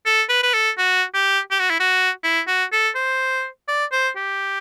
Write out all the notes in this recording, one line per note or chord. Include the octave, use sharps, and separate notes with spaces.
A4
B4
B4
A4
F#4
G4
G4
F#4
E4
F#4
E4
F#4
A4
C5
D5
C5
G4